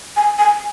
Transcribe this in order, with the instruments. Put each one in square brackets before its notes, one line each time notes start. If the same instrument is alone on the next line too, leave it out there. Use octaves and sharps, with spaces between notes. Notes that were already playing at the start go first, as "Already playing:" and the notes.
[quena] G#5
G#5